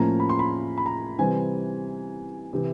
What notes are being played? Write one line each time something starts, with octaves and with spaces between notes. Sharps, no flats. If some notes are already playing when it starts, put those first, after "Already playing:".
Already playing: A2 F3 A#3 C#4 A#5
B5
C6
B5
B5
A#5
C3 E3 G3 C4 G#5
C3 E3